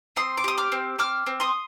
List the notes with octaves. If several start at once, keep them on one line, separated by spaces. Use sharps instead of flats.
C4 C6 D#6
D6
G4 D#6
D6 F6
C4
C4 D6 F6
C4
C6 D#6